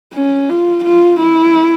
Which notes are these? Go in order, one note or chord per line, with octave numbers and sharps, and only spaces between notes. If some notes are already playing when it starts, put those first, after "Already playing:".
C#4
F4
F4
E4